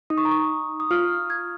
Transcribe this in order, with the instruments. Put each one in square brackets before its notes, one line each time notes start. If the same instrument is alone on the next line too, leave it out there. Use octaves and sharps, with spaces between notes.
[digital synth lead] D#4 [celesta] D#6
[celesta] C#6
A#5
C#6
D#6
[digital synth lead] F4 [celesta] F6
[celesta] G#6